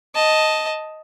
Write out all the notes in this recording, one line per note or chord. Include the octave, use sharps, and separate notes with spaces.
D#5 A5